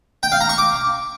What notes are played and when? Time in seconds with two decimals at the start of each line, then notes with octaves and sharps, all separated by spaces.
0.23 G5
0.32 F5
0.41 A#5
0.49 C#6
0.58 D6